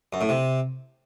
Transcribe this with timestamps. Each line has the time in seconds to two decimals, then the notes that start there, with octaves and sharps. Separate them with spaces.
0.13 F#2
0.21 A2
0.29 C3